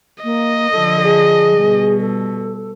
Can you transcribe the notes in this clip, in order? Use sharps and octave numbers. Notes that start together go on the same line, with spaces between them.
A#3 D#5
D3 F3 A4
G#4
B2 G3
A4